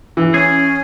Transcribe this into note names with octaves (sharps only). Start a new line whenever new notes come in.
E3
C#4 G#4